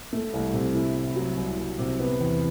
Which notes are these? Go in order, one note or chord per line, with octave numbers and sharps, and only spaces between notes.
A3
C2
C3
E4
A2
F#3
C2
C2
C3
B3
E2